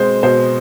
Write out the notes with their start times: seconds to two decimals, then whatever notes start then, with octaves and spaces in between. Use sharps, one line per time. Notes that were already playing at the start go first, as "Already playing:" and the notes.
Already playing: B2 G#3 C4 C5
0.23 B2 C5